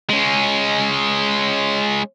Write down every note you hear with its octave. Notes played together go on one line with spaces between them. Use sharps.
G#3 C#4